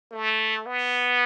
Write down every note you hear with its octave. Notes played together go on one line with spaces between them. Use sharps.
A3
B3